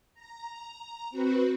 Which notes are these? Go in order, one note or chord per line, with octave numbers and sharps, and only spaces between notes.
A#5
C4 F#4 B4